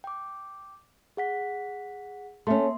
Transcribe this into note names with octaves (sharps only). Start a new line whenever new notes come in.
G5 D6
G#4 F#5 B6
A3 A#3 C#4 E5 C6